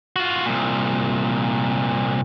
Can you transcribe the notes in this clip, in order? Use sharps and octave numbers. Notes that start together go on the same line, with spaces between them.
F4 F#4
C2 A#2